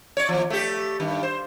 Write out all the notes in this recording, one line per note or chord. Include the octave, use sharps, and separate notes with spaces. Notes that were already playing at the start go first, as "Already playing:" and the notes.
C#5 D5
D#2 F3
A3 G4
G2 D#3
C5